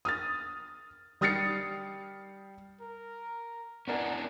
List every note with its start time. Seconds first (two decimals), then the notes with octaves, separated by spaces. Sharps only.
0.05 D#6 F6 A6
1.21 G3 D#6 F6 A6 C7 C#7
2.81 A#4
3.88 B3 C#4 D4 E4 A#4 F#5 G#5